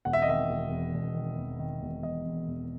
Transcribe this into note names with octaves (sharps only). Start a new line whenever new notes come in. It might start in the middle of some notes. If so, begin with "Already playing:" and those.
E1 F#5
E5
D#5
D#3 E5
E1
E2
E1
D#3
E1
D#3
E1
E2 D#5
E2
E1